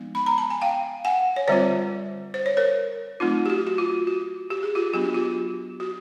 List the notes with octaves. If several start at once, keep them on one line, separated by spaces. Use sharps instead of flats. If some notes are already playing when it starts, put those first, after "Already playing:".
Already playing: F3 G#3 B3 D#4
B5
A#5
A5
G#5
F5 G5
F#5 G#5
C#5
D3 G3 C4 F4 C5 D5
C5
C#5
A#4 C5
F#3 A3 C4 D#4 F4
G4
F#4
F#4
F4
F#4
G4
G#4
F4 G4
F#3 B3 D4 G4
F#4
F4 G4
F#4